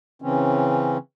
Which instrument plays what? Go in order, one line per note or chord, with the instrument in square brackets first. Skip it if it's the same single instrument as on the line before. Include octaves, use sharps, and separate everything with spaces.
[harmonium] C#3 E3 C4 C#4